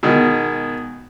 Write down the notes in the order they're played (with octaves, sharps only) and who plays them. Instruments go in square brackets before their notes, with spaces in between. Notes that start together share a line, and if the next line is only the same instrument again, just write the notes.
[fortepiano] B2 D#3 G#3